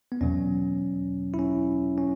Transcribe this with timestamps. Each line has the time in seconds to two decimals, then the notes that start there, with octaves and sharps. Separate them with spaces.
0.12 B3
0.21 E2 B2 F#3 C#4
1.34 E4
1.39 C#4
1.98 C#4